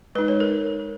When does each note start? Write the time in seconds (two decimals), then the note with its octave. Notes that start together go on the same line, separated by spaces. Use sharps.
0.15 G#3 D#4 B4
0.28 C#5
0.40 A#4